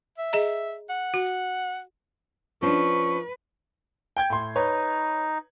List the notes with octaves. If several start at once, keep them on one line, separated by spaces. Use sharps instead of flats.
E5
G#4 D#5 A#5
F#5
F#4
F3 C#4 D4 B4 C#6
G5 G6 G#6
A2 C6
D#4 B4 C#5